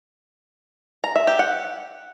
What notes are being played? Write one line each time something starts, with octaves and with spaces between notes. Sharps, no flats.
A#5
E5
G4
F#5